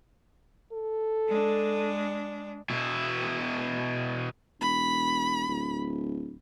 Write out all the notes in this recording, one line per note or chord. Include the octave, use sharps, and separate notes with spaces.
A4
G#3 D4
B2 E4
E1 B5
D1